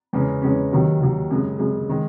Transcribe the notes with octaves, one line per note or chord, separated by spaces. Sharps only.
E2 C#3 G#3 C#4
E2 C#3 G#3 C#4
D#2 D#3 F#3
D#2 D#3 F#3
F#2 C#3 G#3
F#2 C#3 G#3
D#3 G#3